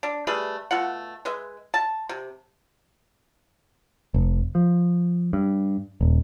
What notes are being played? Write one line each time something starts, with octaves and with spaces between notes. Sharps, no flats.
D4
G3 A3 G#4 B4
B2 A3 F4 F#5
G#3 B4 E5
A5
C3
F1
F3
G2
D#1